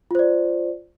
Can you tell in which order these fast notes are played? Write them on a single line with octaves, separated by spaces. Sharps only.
F4 C5 D5